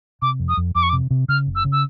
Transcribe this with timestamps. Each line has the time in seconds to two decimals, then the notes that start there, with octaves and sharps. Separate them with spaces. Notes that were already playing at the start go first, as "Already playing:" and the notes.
0.22 C3 D6
0.40 F2
0.49 D#6
0.57 F2
0.75 F2 D6
0.83 C#6
0.89 D6
0.93 C3
1.11 C3
1.28 C#3 F6
1.47 F#1
1.55 E6
1.65 C#3
1.72 E6